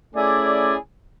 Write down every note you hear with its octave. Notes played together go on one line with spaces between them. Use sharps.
A3 C#4 E4 G#4 D5